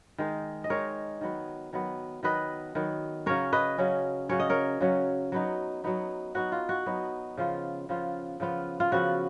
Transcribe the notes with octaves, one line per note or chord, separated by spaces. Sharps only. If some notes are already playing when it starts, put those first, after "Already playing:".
D#3 G#3 D#4
D#5
D#3 G#3 D#4 A#4 C#5
D#3 F#3 B3
D#3 F#3 B3
D#3 F#3 B3 B4 D#5
D#3 F#3 B3
C#3 F#3 C#4 A#4 C#5
B4 D#5
C#3 F#3 C#4
C#3 F#3 C#4 C#5
D#5
A#4 C#5
C#3 F#3 C#4
F#3 B3 D#4
F#3 B3 D#4
F#3 B3 D#4 F#4
F4
F#4
F#3 B3 D#4
C#3 F3 B3 F4
C#3 F3 B3 F4
C#3 F3 B3 F4
F4
C#3 F3 B3 F4 F#4